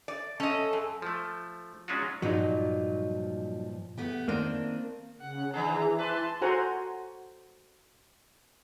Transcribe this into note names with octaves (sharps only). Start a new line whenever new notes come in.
D5
C#4 A4 D#5
F#2
F3 A3
F#3 G#3 C#4 D4 F4 F#4
G2 A#2 F3 F#3 D#4
A3 B3 G4
D#3 A#3 C4 D4
C#3 F#5
D#3 E3 D4 G#4 A#5
B4 A5 C6
F#4 A4 C5 F#5 G#5 A#5